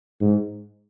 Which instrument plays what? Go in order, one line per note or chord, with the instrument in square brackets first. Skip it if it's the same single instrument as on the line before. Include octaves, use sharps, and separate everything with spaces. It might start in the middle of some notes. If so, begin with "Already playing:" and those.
[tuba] G#2